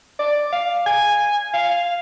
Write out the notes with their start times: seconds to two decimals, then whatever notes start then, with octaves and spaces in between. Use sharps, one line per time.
0.19 D5
0.52 F5
0.86 G#5
1.54 F5